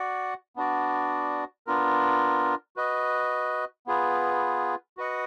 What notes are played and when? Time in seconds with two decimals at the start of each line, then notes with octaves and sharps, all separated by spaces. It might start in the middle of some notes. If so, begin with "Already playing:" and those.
Already playing: F#4 D5 F#5
0.56 B3 D4 F#4 D5
1.67 B3 D4 F4 A#4
2.76 F#4 B4 D#5
3.87 B3 F4 G#4 B4
4.97 F#4 B4 D#5 F#5